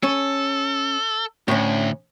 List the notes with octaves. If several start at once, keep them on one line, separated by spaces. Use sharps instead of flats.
C#4 A4
D2 A2 C#4